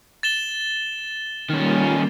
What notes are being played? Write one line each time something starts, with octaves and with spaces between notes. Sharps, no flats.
A6 E7 G7
D#3 G3 A#3 C#4 F4